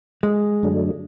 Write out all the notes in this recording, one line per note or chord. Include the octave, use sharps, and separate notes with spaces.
G#3
F#2 D3 F#3 A3 D4